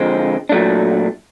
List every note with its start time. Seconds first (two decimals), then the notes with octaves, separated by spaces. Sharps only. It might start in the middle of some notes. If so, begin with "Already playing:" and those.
Already playing: D3 F3 G#3 C4
0.49 A#2 F#3 A3 D4